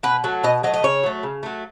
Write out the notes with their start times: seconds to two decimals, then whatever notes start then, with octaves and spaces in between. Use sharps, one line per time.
0.03 B2 B4
0.24 F#3 A3
0.43 B2 D#5
0.63 F#3 D#5
0.67 A3
0.74 D#5
0.83 C#3 C#5
1.03 F#3 A3
1.23 C#3
1.43 F#3 A3